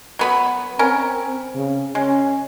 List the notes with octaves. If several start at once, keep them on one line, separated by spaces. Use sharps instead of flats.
F#3 B3 B5
C4 C#4 A#4
C#3
G#3 C#4